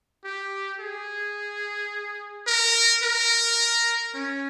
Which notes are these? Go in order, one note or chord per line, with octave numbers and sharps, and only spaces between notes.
G4
G#4
A#4
A#4
C#4